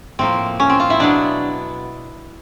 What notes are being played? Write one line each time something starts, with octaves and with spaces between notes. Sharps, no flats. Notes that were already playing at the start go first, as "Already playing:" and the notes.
A2 F3 A#3 C4
C#4
C4
F4
E4
B2 F#3 B3 D4